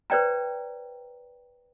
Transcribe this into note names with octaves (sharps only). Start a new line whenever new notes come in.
B4 C5 D5 G5 A#5